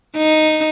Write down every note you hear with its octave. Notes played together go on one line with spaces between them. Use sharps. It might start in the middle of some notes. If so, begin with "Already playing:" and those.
D#4